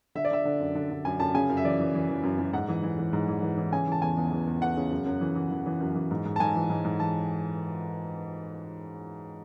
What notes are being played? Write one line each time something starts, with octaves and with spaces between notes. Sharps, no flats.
D3 E5
D5
D3 E5
D3
F#2
D3
D3
F#2 G#5
F#2 A5
C#3 G#5
F#2
E5
E3 D5
E3
E3
E3
F#2
F#2
G#2 F#5
E3
E3
E3
G#2
E3
E3
E3
C#3 G#5
E3 A5
E2 G#5
E2
E3
E2
E3 F#5
C#3
F#2
F#2
E3
E3
E3
E3
F#2
E3
G#2
G#2
A5
G#2 G#5
E3
G#2
G#2
E3 A5